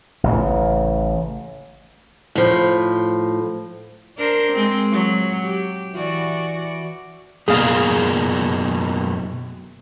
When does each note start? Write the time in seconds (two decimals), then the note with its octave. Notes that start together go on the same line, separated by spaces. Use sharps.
0.24 A1 C#3
2.35 A2 F3
4.17 D4 A#4 C5
4.52 G#3 C4
4.92 F#3
5.44 G4
5.93 E3 F#4 D5
7.48 F#2 B2 A#3 G#4 F5